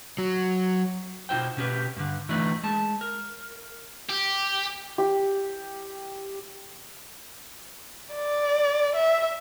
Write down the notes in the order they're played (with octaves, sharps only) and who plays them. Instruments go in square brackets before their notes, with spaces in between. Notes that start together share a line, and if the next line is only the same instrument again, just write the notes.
[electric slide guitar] F#3
B2 D#4 F4 C5 G5
B2 C#4 G4 B4
G2 D3
E3 A3 D4 D#4 B4 D5
G#3 A5
A#4
[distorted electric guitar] G4
[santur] G4
[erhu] D5
E5